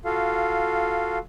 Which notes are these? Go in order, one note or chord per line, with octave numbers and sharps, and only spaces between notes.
F4 F#4 A4 F5